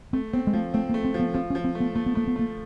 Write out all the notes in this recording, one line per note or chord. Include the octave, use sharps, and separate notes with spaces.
A3 C4
B3 C4
G#3
F3 A3
A3 C4
A#3
A3
C4
F3
B3
F3 C4
C#4
F3
C4
A3
B3
A3 A#3
B3
A3 A#3
B3
A3 A#3